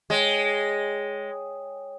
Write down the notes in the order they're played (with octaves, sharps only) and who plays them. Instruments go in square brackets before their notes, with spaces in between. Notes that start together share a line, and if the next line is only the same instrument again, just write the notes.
[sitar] G#3 [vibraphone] C#5 G5